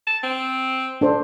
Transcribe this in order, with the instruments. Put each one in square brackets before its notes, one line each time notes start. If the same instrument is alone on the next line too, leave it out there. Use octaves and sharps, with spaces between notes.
[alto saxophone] A5
C4
[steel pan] D4 A4 C5